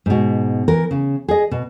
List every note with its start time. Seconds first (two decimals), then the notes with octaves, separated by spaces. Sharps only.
0.06 G#2 B2
0.68 E3 A#4
0.91 C#3
1.29 G#4 D#5
1.51 B2